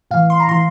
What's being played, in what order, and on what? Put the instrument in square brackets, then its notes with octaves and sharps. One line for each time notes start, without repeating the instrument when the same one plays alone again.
[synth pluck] A2 F5
E3
C6
A#5
A2 E3 C6